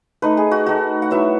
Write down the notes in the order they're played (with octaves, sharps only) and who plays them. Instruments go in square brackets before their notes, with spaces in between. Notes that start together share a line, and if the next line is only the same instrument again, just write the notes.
[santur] A3 D#4 B4
G#4
F#4
A3 D#4 F#4
F#5
F#3 B3 E4 E5